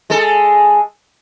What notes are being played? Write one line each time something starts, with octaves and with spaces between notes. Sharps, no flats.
G#3 A4